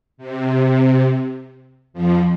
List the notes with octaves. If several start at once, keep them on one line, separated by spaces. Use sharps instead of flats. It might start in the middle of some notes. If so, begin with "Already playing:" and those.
C3
F2 F3